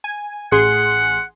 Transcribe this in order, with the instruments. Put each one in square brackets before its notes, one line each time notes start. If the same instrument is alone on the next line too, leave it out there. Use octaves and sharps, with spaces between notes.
[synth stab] G#5
[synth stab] A1 G#4 C6 [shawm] F#5